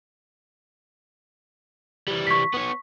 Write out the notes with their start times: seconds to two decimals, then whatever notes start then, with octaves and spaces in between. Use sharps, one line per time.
2.08 E3 G3
2.27 C#6 B6
2.54 B3 C#5